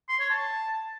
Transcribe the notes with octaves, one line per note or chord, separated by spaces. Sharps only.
C6
C#5
A5